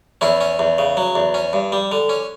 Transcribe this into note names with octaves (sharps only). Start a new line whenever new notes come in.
E2 C#4 E4
C#4
E2
C#3
F#3
E2
C#4
G2
G3
D3
C#4